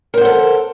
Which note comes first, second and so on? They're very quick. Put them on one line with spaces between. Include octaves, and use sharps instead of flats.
A#4 C5 F#5 A4